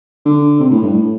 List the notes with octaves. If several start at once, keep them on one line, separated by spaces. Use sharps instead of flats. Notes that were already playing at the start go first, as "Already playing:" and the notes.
D3
C3
A2
G2
A2